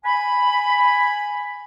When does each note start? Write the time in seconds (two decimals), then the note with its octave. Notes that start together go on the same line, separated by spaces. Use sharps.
0.04 G#5 B5